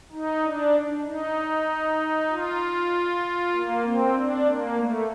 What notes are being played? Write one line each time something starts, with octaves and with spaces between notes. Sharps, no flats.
D#4
D4
D#4
F4
A#3
C4
D4
A#3
A3